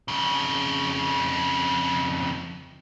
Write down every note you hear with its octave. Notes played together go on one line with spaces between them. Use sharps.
F2 C#3